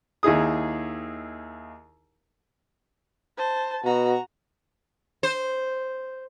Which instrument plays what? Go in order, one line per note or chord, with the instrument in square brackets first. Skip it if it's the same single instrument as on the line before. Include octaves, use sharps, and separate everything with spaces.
[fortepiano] D#2 D#4 E4 G#4 D#6
[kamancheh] C5 A5
[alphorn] B2 [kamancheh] F#4 A#5
[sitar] C5